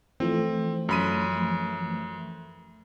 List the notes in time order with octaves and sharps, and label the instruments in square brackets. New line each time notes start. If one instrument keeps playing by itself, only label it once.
[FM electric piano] E3 F3 A3 [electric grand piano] C4
[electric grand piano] F#2 B5 D#7